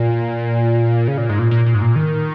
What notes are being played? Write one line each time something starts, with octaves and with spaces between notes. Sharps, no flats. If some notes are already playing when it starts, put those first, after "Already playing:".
Already playing: A#2
C#3
A#2
G#2
A#2
A#2
A#2
G#2
A#2
D#3